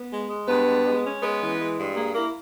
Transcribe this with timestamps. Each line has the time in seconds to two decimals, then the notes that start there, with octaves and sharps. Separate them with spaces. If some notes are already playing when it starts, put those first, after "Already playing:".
Already playing: B3
0.11 G#3
0.30 G#3
0.48 G2 B3 B4
0.67 G#3
0.85 G#3
1.04 C#4
1.23 G#3 B3 B4
1.40 E3
1.60 G#3
1.78 G2
1.96 A#3 G#4
2.14 A#3 E4 A#4